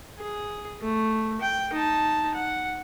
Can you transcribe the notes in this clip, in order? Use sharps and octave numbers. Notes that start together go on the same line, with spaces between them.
G#4
A3
G5
D#4 A5
F#5